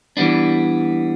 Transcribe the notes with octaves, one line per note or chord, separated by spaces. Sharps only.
E3 G3 B3 D4